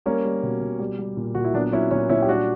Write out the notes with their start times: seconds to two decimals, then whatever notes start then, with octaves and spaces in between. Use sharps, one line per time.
0.06 G3 A#3 C#4
0.25 G3
0.43 B2
0.61 B2
0.79 G3
0.99 G3
1.17 A#2
1.35 A#2 F#4
1.44 E4
1.54 F#3 B3 D4
1.72 F#3 C#4 E4
1.91 A#2 C#4 E4
2.09 A#2 C#4 E4
2.22 G4
2.28 G3 D4 F#4